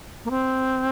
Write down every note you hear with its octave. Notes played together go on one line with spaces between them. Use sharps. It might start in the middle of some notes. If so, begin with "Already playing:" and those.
A#3
C4